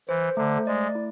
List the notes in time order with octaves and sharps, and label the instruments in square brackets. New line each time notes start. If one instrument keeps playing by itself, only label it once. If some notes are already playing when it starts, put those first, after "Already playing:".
[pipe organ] E3 [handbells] C5
[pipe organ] D3 [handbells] A3
[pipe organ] G#3 [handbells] D5
[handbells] E4